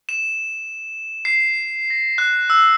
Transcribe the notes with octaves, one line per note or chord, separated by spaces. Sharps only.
E7
C7
A#6
F#6
E6